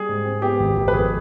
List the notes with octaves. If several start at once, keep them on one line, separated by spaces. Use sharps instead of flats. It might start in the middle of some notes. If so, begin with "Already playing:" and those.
Already playing: G3 G#4
G#2
C4
B3 G4
G#1
G#1
B4
F2 G#4